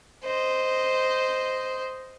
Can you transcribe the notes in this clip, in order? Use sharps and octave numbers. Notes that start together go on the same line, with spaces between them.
C5 D#5